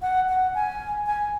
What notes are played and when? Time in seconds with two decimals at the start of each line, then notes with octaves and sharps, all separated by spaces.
0.02 F#5
0.29 F#5
0.54 G#5
1.06 G#5